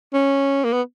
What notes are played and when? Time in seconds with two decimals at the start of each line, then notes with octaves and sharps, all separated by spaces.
0.14 C#4
0.64 A#3
0.73 B3